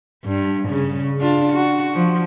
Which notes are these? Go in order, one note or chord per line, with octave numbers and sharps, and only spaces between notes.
G2
C#3
D4 F4
F#4
F3